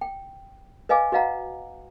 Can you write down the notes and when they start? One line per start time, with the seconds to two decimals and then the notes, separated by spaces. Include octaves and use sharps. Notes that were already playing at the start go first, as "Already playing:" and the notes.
0.01 G5
0.89 B4 D#5 F5 G#5 D6
1.12 F#4 B4 D#5 F5 F#5 A#5